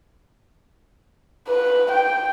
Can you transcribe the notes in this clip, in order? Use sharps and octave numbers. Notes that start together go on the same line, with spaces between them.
B4
G5